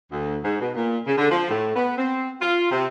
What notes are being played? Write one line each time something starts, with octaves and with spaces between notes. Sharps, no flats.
D2
G#2
B2
A#2
C#3
D3
F3
A2
B3
C4
F4
C3